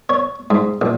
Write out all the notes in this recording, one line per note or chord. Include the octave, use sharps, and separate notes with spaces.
C#5
G#2
A#1